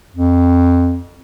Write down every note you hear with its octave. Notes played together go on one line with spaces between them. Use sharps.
F2